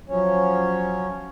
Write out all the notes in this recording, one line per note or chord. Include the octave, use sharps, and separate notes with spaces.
F3 F#3 C#4 C#5